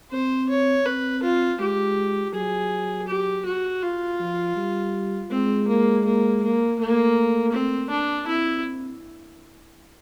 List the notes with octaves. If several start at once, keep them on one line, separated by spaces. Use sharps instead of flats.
C4 C5
C#5
C4 B4
F4
G#3 G4
F#3 G#4
G4
F#4
F4
F3
G3
G#3 C4
A#3
A#3
A#3
A3 A#3
C4
D4
C4 E4